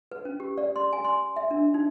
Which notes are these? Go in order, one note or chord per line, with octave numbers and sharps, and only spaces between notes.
B4
C#4
G4
D5
C6
G#5
C6
E5
D4
D#4